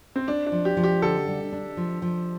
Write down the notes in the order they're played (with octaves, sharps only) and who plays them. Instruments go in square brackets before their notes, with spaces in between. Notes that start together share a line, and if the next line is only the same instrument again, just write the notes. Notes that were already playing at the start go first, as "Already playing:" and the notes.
[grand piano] C4
[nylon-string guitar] C4 [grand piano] D4
[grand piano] D4
[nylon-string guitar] F3
[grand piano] G4
[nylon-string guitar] F3
[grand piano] G4
[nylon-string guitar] D3 [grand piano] A4
[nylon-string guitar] G3
D4
F3
F3